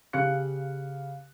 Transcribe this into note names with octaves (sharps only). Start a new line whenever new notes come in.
C#3 G4 F5 F#6 C#7